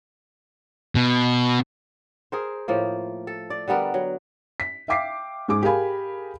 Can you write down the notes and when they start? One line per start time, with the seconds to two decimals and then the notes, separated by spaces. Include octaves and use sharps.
0.95 B2
2.32 G#4 A#4 C5
2.68 A2 F3 A#3
3.27 A4
3.50 D5
3.68 D3 G3 B3 A#4
3.94 F#3
4.60 B6
4.88 E5 F5 G5 D6 B6 C7
5.48 G#2 G#4 D6
5.63 G4 G#4 A#4 F5 G#5 B5